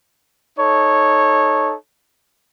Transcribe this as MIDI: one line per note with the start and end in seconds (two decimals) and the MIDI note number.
0.59 1.75 63
0.59 1.75 69
0.59 1.75 73